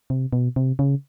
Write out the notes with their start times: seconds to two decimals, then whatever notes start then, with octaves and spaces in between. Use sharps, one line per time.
0.10 C3
0.33 B2
0.56 C3
0.79 C#3